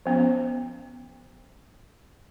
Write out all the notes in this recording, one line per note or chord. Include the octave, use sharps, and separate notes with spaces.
F3 B3 C#4